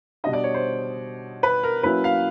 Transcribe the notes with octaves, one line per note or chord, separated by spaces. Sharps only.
B2 G3 B3 D4 D#5
D5
C#5
C5
B4
A#4
F#3 A#3 C#4 E4 B4
F5